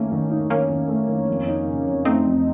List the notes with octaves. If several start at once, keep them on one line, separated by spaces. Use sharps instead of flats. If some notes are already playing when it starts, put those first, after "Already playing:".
Already playing: D#3 A3 A#3 C#4
D#3
D#4
D#3 A#3 C#4
D#3
A3
D#3
F2
D#4
C#3
F2
A3 C4 D#4
F2